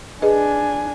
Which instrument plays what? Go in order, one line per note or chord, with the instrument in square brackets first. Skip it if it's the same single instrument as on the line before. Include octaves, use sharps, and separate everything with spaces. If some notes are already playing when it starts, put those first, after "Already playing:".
[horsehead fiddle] D4 G#5 [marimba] G#4 B4 D#5